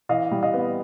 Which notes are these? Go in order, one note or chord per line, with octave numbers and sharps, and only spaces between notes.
E3 D#5 F5
G3
D#5 F5
B3